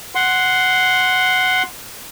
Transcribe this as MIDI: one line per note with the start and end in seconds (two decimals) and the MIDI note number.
0.15 1.63 78
0.15 1.63 84